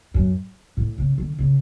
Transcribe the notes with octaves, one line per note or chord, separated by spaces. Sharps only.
F#2
A2
C#3
D3
C#3